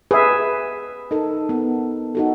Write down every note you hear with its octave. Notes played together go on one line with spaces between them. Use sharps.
G#4 B4 E5
D#4 A4 A#4
B3
D#4 F#4 A4